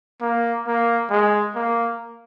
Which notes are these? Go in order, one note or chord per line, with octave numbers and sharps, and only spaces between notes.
A#3
A#3
G#3
A#3